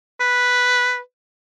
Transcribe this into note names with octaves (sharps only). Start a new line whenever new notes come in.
B4